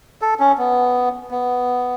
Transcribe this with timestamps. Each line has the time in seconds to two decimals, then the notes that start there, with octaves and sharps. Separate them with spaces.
0.22 A4
0.40 C#4
0.58 B3
1.31 B3